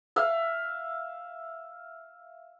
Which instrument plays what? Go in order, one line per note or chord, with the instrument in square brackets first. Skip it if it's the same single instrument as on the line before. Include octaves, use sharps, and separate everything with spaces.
[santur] E5 F5